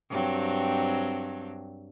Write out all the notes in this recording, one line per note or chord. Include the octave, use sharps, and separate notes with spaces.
G2 F#3 C4